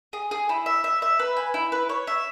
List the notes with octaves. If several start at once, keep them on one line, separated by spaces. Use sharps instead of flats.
G#4
G#4
E4
E5
E5
E5
B4
G#5
E4
B4
C#5
E5